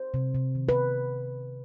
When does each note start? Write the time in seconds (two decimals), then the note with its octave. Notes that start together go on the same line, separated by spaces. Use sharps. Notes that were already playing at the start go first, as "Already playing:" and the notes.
Already playing: C5
0.14 C3
0.35 C3
0.55 D#3
0.69 B4